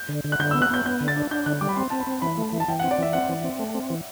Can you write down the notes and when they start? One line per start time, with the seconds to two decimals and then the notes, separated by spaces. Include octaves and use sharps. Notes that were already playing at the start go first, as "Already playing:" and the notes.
Already playing: G6
0.09 D3
0.24 D3
0.32 F#6
0.39 D3 G6
0.51 B3 E6
0.62 F#6
0.70 B3 G6
0.86 B3 G6
1.01 D3
1.08 A6
1.16 D4
1.31 D4 G6
1.46 D3 F#6
1.61 G3 D6
1.69 B5
1.77 C4 C6
1.90 C4 A5
2.00 B5
2.07 C4
2.22 E3 B5
2.38 A3
2.53 E3
2.60 A5
2.68 E3 G5
2.79 C4 F#5
2.91 D5
2.98 E3 E5
3.13 C4 F#5
3.29 E3
3.44 C4
3.59 A3
3.74 C4
3.90 E3